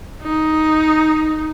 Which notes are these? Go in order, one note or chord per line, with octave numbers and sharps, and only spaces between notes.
D#4